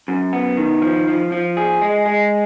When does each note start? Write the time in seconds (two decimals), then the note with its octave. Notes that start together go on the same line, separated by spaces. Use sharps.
0.08 F#2
0.33 B3
0.57 D#3
0.82 F3
1.08 F3
1.32 F3
1.57 G#4
1.82 G#3
2.06 G#3